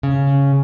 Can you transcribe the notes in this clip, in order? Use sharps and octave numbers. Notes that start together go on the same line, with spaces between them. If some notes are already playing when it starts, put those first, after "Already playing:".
C#3